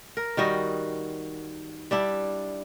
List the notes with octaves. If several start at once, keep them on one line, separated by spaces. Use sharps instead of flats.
A#4
D#3 G3 F#4 D#5
G3 D4 E4